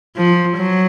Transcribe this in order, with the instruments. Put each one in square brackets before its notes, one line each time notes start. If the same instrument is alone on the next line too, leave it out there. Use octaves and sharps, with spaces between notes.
[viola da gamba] F3
F#3